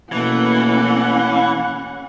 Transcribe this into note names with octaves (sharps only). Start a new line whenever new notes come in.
B2 E3 A3 A#3 C#4 F#5